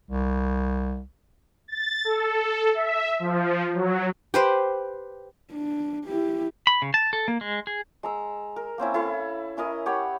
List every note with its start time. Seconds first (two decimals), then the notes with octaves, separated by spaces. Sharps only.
0.11 C2
1.68 A6
2.05 A4
2.74 E5
3.19 F3
3.74 F#3
4.34 G4 B4 C5
5.52 D4
6.06 E4 G4
6.67 B5
6.82 C#3
6.94 A5
7.13 A4
7.28 A#3
7.41 G#3
7.67 G#4
8.03 G#3 A#5 E6
8.56 A#4
8.78 A#3 C4 C#4 E4
8.94 E4 A4 F5 B5
9.57 C#4 E4 A#4 D#5
9.86 G4 C#5 F#5 B5